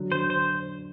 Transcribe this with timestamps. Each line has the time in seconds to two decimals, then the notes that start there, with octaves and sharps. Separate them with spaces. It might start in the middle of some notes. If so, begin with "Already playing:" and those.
Already playing: D3 F#3
0.12 D3 F#3 C5
0.30 C5